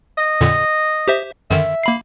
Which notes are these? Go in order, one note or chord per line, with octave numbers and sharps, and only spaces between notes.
D#5
F2 A#2 D3
G4 C5 E5
F#2 D3 D#3 E5
A#3 B5 C7